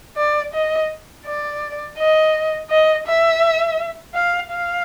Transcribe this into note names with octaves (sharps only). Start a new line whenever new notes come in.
D5
D#5
D5
D#5
D#5
E5
F5
F5